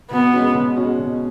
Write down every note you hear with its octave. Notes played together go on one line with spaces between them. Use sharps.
B2 B3
G#3 C#4 F#4
B2
G#3 C#4 F#4
B2